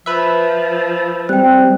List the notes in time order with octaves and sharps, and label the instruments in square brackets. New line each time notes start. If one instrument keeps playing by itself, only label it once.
[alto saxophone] F3 [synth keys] B4 E5
[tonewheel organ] G3 C4 [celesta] G5 F#6